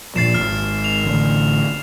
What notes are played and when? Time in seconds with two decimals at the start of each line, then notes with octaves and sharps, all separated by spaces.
0.16 A#2 F3 A6 C7 E7
0.34 D#1 G#1 F6
0.84 F7
1.06 A1 D3